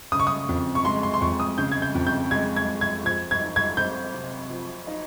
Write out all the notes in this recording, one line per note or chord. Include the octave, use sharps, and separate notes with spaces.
C#3 D#6
C#6
D#6
F2
C#6
G#3 C6
C6
C6
F2 C#6
D#6
C#3 G6
G#6
G6
F2
G6
G#3 G#6
G#6
F2
G#6
F3 G#6
G#6
D#4
G#6
C4 G6
C3
F3
D#4